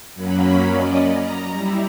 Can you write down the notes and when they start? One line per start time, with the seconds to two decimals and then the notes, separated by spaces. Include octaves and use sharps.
0.15 F#2 F#3 A#3 C#4 B5
0.74 C#4 D5 D#5
1.10 A#5
1.51 G3 E4